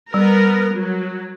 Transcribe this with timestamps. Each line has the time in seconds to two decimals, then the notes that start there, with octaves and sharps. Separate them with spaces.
0.14 G3 B3 A#4
0.76 F#3